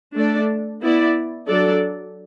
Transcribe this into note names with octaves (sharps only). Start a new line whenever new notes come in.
A3 D4 A4 D5
B3 E4 D5
F#3 D4 A4 D5